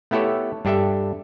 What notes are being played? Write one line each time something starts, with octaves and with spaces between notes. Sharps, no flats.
A3 B3 E4 G4 A4 C#5
G2 D4 G4 A4 E5